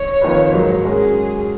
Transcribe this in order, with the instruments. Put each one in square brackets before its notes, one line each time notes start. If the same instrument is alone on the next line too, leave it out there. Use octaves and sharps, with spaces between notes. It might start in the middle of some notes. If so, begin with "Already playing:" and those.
Already playing: [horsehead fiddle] C#5
[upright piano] F2 D#3 A#3 F4 B4
G#2 F#3 A#3 D#4 A#4
[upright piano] G#3 C#4 F#4 A#4 [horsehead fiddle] G#4